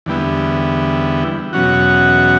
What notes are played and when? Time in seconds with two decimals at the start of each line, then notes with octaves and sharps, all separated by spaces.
0.06 E2 D3 G3 B3 E4
1.53 E2 B2 F#3 C#4 F#4